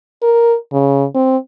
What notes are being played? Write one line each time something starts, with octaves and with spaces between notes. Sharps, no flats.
A#4
C#3
C4